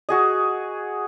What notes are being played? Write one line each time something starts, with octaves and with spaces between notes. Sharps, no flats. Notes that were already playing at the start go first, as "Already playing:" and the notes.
F#4 G#4 D#5